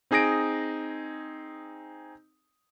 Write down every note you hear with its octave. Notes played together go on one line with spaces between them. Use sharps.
C4 D#4 G#4 D#6 A#6 D7